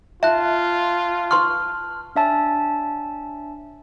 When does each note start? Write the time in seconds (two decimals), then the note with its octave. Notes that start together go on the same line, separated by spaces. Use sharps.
0.23 F4 E5 A5 F#6
1.31 B4 C6 C#6 F6
2.16 D4 C#5 E5 G#5 A5